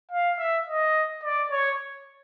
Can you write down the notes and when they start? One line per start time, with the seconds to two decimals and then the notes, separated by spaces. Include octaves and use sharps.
0.11 F5
0.39 E5
0.68 D#5
1.24 D5
1.51 C#5